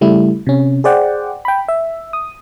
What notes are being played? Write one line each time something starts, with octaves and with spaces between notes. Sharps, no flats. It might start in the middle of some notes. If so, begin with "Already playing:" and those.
C#3 G3 A3 E4
C3 C#4
G#4 C5 D5 F#5 G5
G5 B5
E5
D#6